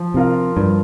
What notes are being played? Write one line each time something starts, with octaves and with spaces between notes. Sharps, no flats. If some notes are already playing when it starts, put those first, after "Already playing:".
Already playing: F3
C3 C4 F4 A#4 F5
G2 F3